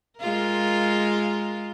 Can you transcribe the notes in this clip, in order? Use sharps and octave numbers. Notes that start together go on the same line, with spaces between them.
G#3 F4 A#4